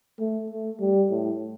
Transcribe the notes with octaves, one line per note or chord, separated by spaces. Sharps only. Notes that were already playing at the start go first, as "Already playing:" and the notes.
A3
A3
G3
A2